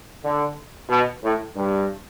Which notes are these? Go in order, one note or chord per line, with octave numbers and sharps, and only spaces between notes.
D3
B2
A2
G2